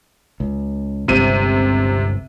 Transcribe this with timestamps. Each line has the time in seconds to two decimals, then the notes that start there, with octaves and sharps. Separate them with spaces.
0.40 C#2
1.08 G1 C#2 G2 C3 D#7